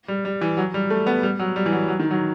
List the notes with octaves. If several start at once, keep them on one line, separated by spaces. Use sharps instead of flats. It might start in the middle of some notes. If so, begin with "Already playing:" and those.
G3
G3
E3
F#3
G3
A3
B3
G3
F#3
G3
E3
F#3
F#3
D#3
F#3